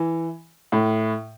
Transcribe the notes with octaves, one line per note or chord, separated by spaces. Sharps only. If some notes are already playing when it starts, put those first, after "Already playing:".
Already playing: E3
A2